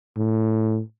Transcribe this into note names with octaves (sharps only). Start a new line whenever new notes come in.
A2